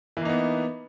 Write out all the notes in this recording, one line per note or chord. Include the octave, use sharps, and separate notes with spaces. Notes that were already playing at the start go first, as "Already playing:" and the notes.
E3 A#3 B3 D#4